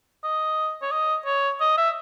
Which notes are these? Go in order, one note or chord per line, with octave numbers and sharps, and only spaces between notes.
D#5
C#5
D#5
C#5
D#5
E5